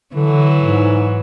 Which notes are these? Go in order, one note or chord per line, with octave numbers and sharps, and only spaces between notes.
D3 E3 F#3
G#2